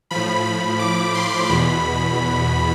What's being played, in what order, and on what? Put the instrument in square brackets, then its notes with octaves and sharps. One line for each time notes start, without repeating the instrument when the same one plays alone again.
[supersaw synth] A2 F3 B5
B5
D6
C6
E2 B2 B5